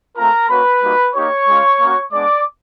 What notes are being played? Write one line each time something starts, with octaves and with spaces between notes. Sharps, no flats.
A3 C4 F4 A#4 A#5
A#3 C#4 F#4 B4 B5
G3 A#3 D#4 F#4
A#3 D#4 G4 C#5 C#6
G#3 C#4 F4
A#3 C#4 F#4
G#3 B3 D4 D5 D6